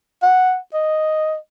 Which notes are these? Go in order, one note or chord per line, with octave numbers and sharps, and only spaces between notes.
F#5
D#5